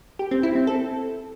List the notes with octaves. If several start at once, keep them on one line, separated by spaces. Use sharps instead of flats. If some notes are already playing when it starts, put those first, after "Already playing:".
G4
C4
E4
C4
A4